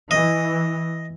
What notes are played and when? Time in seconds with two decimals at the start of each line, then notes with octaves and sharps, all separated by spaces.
0.11 E3 D#5